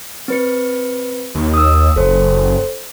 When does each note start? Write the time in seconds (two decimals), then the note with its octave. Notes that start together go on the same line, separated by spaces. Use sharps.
0.28 C4 B4 C#7
1.35 D#2
1.54 D#6 E6
1.96 F#1 A4 C5